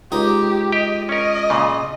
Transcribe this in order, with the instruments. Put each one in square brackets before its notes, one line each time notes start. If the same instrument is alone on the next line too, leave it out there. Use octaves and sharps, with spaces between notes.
[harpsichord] C#2 D#4 [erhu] G4
[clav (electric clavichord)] G4 [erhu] D#5
[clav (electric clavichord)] C#4 A#4 [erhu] D#5
[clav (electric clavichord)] A#2 C#3